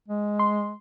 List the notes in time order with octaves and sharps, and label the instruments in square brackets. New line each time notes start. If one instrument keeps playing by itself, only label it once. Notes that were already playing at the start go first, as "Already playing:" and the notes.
[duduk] G#3
[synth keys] C6